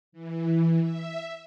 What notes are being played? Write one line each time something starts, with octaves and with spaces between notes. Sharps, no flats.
E3
E5